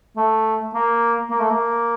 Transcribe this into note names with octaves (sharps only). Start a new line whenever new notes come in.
A3
A#3
A#3
A3
A#3